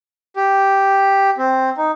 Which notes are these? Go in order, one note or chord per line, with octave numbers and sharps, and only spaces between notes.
G4
C4
D#4